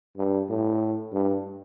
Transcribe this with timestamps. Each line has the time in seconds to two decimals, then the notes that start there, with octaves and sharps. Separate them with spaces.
0.17 G2
0.49 A2
1.13 G2